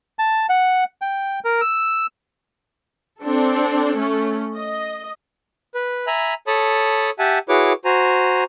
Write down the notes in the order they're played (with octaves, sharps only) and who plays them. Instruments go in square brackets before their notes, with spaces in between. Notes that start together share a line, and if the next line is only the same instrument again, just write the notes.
[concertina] A5
F#5
G5
A#4
E6
[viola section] C4 D4 A4
A3 C#4
D#5
[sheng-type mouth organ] B4
E5 G#5 A#5 B5
A4 C#5 A5 B5 D#6
G4 E5 F#5 G#5 A5
E4 F#4 G#4 B4 C#5 D6
F#4 C5 G#5 A#5